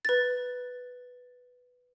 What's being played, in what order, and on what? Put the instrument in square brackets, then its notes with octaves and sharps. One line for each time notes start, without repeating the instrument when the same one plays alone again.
[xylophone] B4 A6